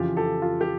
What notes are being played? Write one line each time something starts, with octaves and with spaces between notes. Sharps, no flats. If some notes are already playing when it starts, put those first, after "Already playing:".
Already playing: F2 C#3 E3 F4 G4
G4 A4
F4
G4